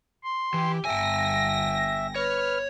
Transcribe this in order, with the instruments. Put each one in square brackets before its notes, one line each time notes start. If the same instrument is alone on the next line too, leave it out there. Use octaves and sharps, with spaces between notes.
[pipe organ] C6
[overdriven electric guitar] E3 [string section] G4
[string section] G1 A#6 [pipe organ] E5 [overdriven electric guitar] G5 G#5
[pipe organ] B4 F6 [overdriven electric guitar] C#5